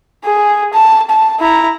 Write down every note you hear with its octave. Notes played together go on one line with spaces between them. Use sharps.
G#4
A5
A5
E4 A#5